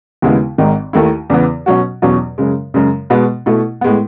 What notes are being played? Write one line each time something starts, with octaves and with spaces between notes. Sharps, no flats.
D#2 C#3 G#3 B3 E4
G#1 G#2 D#3
D#2 D#3 A3 E4
E2 C#3 E3 B3
B2 F#3 C#4 F#4
E2 B2 F#3 C#4
F#2 C#3 G#3
F#2 C#3 G#3
B2 G#3 B3 F#4 B4
B2 A3 E4
A2 G#3 B3